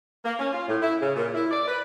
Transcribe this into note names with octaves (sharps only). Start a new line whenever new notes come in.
A#3
C#4
F4
A2
E4
C#3
A#2
E4
D5
B4